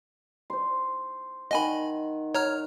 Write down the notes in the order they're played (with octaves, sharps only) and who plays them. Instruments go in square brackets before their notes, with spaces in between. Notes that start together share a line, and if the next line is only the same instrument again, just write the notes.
[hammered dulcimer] C5 C6
[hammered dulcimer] D#3 F#5 [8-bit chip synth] D#5 G#5 B5
[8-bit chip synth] C#5 A#5 F6 [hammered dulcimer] F#5